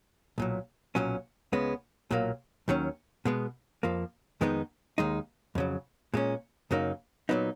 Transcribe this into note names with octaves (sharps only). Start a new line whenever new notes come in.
B1 A#2 F#3
B1 A#2 F#3 C#4
C#2 C#3 G#3 B3
B1 A#2 F#3 A#3
D#2 D#3 F#3 C#4
B2 G#3 B3
F2 F3 A#3
F2 D#3 G#3 B3 D#4
D#2 D#3 G#3 D#4
F2 C#3 F#3
A#2 G#3 C#4
F#2 C#3 F#3 A#3 D#4
A#2 F#3 B3 D#4